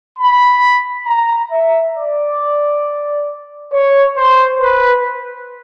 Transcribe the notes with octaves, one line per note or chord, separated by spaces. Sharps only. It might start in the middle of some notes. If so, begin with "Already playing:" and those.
B5
A#5
E5
D5
C#5
C5
B4